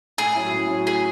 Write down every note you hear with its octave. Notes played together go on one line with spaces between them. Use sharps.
A2 G#4
F#3 C#4 E4
A2
F#3 C#4 E4
G#4